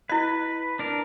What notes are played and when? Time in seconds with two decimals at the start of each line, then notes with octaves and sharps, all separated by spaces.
0.10 E4 B4 D#5
0.79 D4 A#4